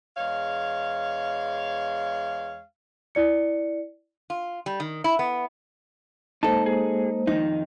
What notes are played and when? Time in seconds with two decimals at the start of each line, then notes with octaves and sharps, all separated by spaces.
0.17 E2 G#3 C#5 F5
3.15 E4 D5 C#7
4.30 F4
4.66 G3
4.80 D#3
5.04 E4
5.19 B3
6.43 G#3 A#3 D#4 A4 C5 A5
6.66 G#4
7.27 F2 D#3 D#4